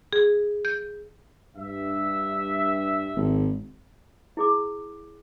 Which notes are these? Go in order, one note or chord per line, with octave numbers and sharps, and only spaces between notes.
G#4
G6
G2 E5
G#1
E4 G#4 D6